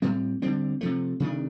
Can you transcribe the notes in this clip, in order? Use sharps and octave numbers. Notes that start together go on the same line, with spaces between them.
A2 G3 C4
D3 G3 C4
C3 F3 A3
C3 D#3 A3 D4